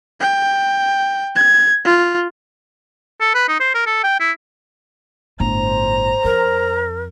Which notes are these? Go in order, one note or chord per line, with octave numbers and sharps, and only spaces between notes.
G5
G#6
F4
A4
B4
D#4
C5
A#4
A4
G5
E4
G1 A2 C5 A#5
F2 A#4